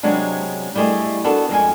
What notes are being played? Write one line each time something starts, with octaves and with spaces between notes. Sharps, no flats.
C3 F#3 G#3 B3 D4
G3 A3 E4 G#4 D#5
B3 D4 F#4 A4 B4
F2 G#3 A4 G#5